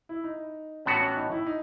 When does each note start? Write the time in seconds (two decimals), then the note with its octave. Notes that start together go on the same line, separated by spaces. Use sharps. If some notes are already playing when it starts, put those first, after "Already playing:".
0.09 E4
0.24 D#4
0.86 A2 E3 B3 C#4 F#4
1.01 C#4
1.16 D#4
1.31 E4
1.47 D#4